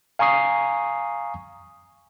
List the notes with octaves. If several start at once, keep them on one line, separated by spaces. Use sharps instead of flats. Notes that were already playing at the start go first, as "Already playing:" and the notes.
F5 G#5 A#5 C#6 D#6 C7